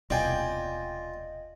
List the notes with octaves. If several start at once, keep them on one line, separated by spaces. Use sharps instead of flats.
D#1 C2 B2 F4 D5 D#5 G5 G#5